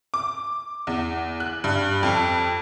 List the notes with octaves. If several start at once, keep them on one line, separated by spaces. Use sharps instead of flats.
D6
E2
F#6
G2
F2